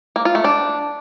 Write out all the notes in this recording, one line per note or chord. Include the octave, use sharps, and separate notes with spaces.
A#3
F4
A3
D4